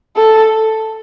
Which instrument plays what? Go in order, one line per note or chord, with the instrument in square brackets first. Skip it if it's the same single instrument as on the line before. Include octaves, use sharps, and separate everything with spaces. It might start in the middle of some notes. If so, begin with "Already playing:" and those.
[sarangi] A4